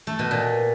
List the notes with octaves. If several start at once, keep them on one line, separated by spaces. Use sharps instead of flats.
A3
B2
A#2